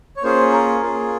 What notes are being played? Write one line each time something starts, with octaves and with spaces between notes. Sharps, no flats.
C#5
A#3 C#4 F4 G#4 C5
A#4
A#3 F4 G#4